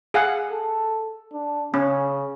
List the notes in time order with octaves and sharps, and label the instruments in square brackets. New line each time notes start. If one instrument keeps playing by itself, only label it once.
[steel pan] G#4 F5 F#5
[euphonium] A4
D4
[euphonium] C#3 [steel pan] C#4